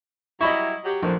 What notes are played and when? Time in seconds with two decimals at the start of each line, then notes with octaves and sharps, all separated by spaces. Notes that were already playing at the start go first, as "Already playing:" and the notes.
0.41 F#3 G3 E4 D#5 B5 C#6
0.85 F#3 G4
1.03 A#1 F#2 A2 C4